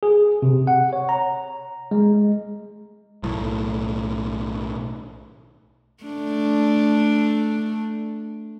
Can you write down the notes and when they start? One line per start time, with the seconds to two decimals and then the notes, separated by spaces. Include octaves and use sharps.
0.03 G#4
0.42 C3
0.67 F#5
0.93 C#5
1.09 A#5
1.91 G#3
3.23 B1 A2
6.04 A3 D4